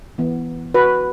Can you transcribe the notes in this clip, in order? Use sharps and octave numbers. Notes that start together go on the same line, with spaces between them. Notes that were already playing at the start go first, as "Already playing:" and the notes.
E3 B3
F#4 B4